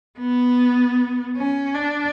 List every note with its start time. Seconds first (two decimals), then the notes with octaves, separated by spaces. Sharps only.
0.19 B3
1.36 C#4
1.74 D4